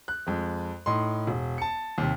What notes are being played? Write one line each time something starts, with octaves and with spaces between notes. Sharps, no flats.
F#6
F2 G#3
A2 D#4 C6
E1
A5 C#7
D#2 C3